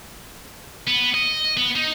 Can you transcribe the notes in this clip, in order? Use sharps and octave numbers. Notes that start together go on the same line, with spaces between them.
B3
D#5
B3
D#4